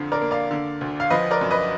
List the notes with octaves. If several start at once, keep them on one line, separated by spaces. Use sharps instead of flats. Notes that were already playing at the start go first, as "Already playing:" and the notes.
Already playing: F2 D3 F3
A#4 D5
A#3
D5 F5
D3
D2
F5
F3 B4 D#5
A#4 D5
F#2
B4 D#5